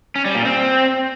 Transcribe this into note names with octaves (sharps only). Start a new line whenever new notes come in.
C#4
G3
A#2
C4